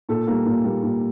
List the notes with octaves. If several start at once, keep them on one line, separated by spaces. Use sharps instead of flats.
A#2 A4
G3 A#3
A#2
G3 A#3
A#2